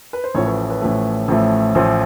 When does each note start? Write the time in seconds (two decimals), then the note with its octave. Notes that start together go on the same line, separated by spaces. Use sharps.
0.13 B4
0.24 C5
0.35 A1 A2 F3 A3 C#5
0.46 B4
0.70 B4
0.81 A1 A2 F3 A3
1.28 A1 A2 F3 A3
1.75 A1 A2 F3 A3 C5